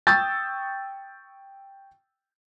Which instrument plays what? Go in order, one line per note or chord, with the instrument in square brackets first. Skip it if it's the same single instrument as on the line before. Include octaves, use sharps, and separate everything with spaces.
[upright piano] G5 C#6 D#6 E6 G6 A6